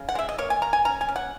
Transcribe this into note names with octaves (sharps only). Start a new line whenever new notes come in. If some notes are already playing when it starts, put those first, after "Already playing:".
Already playing: C#3
F#5
G#3 E5
D#5
A#3 C#5
G#5
A#3 A#5
G#5
C#4 A#5
G#5
C#4
F#5